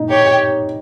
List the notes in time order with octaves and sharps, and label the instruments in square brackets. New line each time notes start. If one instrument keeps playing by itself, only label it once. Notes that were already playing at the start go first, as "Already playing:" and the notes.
Already playing: [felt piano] D#4
[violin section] G4 C#5 G5